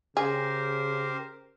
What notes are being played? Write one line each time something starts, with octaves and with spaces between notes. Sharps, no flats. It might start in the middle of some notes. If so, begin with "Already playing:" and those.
C#3 G4 G#4 A#4 C5